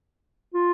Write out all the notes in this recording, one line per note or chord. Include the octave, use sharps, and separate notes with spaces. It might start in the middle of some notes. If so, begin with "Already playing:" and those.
F4